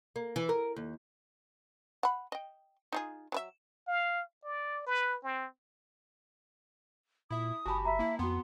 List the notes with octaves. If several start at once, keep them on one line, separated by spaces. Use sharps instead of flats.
A#3
E3
A#4
D#2
F#5 B5
D#5 G5
D#4 F4 G#4
F#3 B4 E5
F5
D5
B4
C4
A#2 E4 E5 D#6
F#1 F#4 G4 G#5 A5 B5
E5 A#5 B5
A#3 E4
F2 B3 F#4 G5 C6